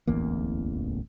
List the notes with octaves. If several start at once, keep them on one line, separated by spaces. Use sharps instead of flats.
D1 A1 E2 A#3